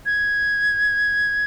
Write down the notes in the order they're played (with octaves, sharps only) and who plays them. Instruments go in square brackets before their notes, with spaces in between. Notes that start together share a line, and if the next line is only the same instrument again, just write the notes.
[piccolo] G#6